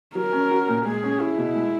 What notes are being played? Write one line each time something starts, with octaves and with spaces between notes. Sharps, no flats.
F#3 A#4
C#4
F#4
A#2
G#3 G#4
C#4
E4 G#4
B2
G#3